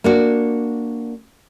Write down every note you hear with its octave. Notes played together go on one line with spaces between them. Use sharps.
A#3 D4 F#4